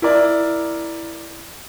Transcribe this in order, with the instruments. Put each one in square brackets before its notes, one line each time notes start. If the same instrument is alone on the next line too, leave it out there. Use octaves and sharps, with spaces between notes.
[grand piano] E4 A#4 D5